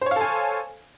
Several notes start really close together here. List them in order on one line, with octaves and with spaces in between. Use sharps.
C5 C#5 F5 A4 G#5